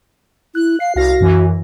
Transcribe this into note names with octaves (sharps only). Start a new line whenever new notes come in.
E4 F#6
F5 C7
C2 F#4 F5 A#6
F#2 E3